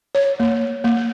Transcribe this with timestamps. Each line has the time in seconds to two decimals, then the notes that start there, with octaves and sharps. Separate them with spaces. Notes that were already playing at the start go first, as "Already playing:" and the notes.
0.15 C#5
0.40 A#3
0.84 A#3